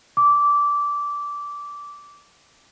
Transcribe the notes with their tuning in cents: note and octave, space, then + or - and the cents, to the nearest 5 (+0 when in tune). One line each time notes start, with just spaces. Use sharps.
D6 -15